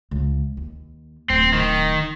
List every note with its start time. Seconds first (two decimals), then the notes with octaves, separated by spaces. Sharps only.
0.11 C#2
0.57 D#2
1.30 D1 C4
1.54 D#3